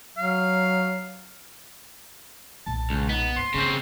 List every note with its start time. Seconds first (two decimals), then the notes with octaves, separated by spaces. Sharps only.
0.17 F#3 F5
2.66 B1 A#2 A5
2.90 C#2
3.09 B3 D#4
3.36 F#2 C6
3.54 C#3 A#3 C4